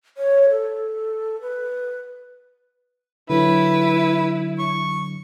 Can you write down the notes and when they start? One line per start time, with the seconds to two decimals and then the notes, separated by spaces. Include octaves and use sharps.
0.17 C#5
0.50 A4
1.42 B4
3.30 D3 F#3 E4 B4
4.59 C#6